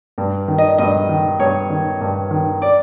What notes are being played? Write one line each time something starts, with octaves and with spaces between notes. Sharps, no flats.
G2
D#3
D#5
G2 D#5
D#3
G2 C#5
D#3
G2
D#3
D5